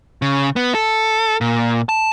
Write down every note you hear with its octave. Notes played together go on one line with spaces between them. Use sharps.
C#3
B3
A4
A#2
A5